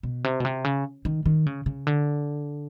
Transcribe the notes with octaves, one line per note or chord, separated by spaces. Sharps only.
B2
C3
B2
C3
C#3
D#3
D#3
C#3
C#3
D3